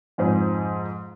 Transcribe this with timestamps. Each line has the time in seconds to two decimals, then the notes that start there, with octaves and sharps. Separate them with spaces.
0.18 F2 G#2 C5